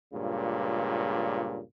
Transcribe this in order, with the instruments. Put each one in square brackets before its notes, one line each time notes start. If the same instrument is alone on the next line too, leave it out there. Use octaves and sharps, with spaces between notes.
[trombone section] C#2 G2 A#2 C#3